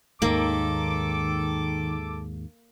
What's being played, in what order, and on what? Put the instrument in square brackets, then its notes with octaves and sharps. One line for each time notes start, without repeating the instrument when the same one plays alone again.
[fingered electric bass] D#2 G#2 [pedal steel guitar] D#3 [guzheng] A#3 [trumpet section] A4 D6